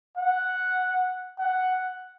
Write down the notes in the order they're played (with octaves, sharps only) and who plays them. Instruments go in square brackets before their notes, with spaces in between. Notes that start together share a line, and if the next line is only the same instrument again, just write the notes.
[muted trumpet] F#5
F#5